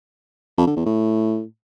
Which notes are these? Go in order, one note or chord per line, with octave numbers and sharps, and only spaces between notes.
F2
D3
E2
A2